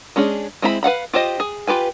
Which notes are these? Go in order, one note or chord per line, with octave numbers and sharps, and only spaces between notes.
G#3 C#4 D4 G#4
G#3 C4 E4 C5 B5
B4 F5 F#5 B5
F4 G4 C5 D#5
G#4
F4 G4 B4 G#5